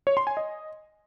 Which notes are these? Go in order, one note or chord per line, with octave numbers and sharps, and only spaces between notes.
C#5
C6
G#5
D#5